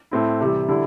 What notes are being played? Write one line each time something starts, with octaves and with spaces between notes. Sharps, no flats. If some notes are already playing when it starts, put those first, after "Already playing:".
A2 A3 C4 E4
C3 E3 G3
D3 G3 E4